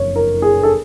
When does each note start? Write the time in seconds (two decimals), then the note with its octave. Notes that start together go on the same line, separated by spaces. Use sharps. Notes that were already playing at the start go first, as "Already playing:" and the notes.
Already playing: F#1 F2 C#5
0.16 A#4
0.42 G#4
0.63 A4